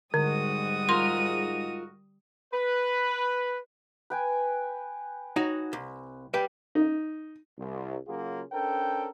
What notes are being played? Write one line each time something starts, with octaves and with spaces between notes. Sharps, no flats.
G#2 D3 G3 G#3 F#4 D#6
F4 A#4 C6
B4
B4 G5 G#5
D#4 F#4 C#5
C2
G3 B4 G5
D#4
C2
C#3 F#3 A#3 F4 F#4 G#4
C#4 D4 A4 A#4 C5 G5